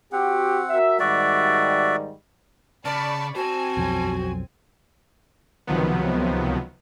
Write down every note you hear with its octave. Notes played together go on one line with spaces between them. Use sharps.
C4 F#4 G4 F#5
F#4 A#4 E5
G#2 D#3 G3 F#4 D5 E5
C#3 D5 A5 B5 C#6
C4 F#4 G4 G#5 A5
B1 F2 F#3
C#2 C3 D#3 F3 F#3 B3